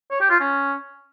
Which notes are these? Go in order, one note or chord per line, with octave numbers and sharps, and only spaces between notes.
C#5
G4
F4
C#4